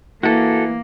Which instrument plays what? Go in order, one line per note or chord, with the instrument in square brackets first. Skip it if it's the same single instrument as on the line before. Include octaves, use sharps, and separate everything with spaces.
[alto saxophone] E3 [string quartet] A#3 [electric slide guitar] F#4 A4